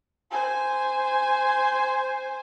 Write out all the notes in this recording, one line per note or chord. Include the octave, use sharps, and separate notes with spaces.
C5 G#5